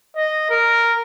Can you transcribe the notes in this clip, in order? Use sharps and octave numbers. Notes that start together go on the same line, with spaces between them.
D#5
A#4